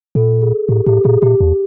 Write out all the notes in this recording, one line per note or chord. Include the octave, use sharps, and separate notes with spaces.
A#2 A4
G#4
A2 G4
A2 G4
A#2 G#4
A#2 G4
E2